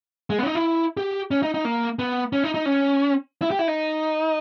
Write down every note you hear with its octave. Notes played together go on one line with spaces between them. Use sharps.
G#3
B3
C#4
D#4
E4
G4
C#4
D#4
D#4
A#3
B3
C#4
D#4
D#4
C#4
E4
G4
E4
D#4